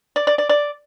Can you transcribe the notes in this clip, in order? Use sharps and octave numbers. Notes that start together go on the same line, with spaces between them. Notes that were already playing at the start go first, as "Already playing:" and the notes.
D5
D5
D5
D5